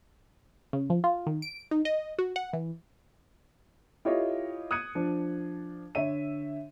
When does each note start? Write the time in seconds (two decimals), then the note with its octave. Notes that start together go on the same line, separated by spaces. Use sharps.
0.73 C#3
0.90 F3
1.04 F4
1.27 D#3
1.42 D7
1.71 D#4
1.85 D#5
2.18 F#4
2.36 F#5
2.53 E3
4.05 E4 F4 G4 A4 C#5 D#5
4.71 D#6 F#6 G#6 C#7 D#7
4.95 F3 D4
5.95 D3 C#5 E5 D#7